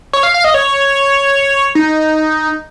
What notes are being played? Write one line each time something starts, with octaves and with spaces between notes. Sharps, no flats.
C#5
F5
F5
D#5
C#5
D#4